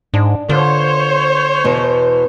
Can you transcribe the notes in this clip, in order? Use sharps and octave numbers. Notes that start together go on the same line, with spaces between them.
G#2 D4
D3 B3 F4 C5 C#5
E2 B2 E3